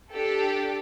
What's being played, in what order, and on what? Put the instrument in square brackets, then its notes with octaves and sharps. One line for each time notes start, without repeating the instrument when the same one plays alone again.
[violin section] D4 G4 A4